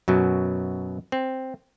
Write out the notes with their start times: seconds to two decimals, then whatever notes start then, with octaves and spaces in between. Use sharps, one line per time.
0.08 F#2 B2 F#3
1.12 C4